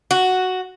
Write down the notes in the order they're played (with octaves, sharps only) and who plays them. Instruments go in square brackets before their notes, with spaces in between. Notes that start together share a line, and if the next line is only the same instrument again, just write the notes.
[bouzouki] F#4